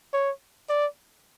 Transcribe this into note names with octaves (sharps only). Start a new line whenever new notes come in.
C#5
D5